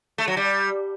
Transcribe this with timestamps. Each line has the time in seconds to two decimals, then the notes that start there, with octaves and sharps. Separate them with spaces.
0.18 A3
0.28 F#3
0.37 G3